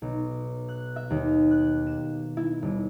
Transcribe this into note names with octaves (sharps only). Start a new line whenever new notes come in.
B1
F#6
E5
D#2
F#6
E7
E4
D#1